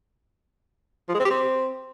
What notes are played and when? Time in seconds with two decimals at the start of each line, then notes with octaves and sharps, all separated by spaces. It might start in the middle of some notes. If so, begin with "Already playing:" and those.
1.09 F3
1.14 G#3
1.20 C4
1.25 G4
1.30 C4